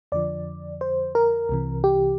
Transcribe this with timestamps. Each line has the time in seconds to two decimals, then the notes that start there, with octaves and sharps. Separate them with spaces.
0.12 F2 D3 F3 D5
0.81 C5
1.15 A#4
1.49 C2 C3 E3
1.84 G4